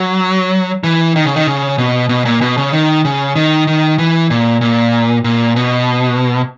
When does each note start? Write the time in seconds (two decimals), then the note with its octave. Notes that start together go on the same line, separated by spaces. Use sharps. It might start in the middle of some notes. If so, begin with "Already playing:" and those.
Already playing: F#3
0.84 E3
1.16 D#3
1.25 C#3
1.36 D#3
1.47 C#3
1.78 B2
2.09 B2
2.25 A#2
2.41 B2
2.57 C#3
2.73 D#3
3.05 C#3
3.36 D#3
3.67 D#3
3.98 E3
4.30 A#2
4.61 A#2
5.24 A#2
5.56 B2